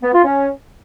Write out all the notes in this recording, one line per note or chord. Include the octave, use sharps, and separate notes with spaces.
B3
F4
C#4